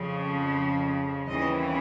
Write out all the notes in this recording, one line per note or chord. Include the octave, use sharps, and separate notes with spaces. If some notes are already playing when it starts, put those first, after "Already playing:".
Already playing: F2 C#3 F3
D#2 C#3 E3 G3 C4 D#5